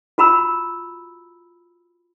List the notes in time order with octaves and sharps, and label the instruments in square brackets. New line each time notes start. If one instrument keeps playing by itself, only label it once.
[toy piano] F4 F#4 A#5 B5 E6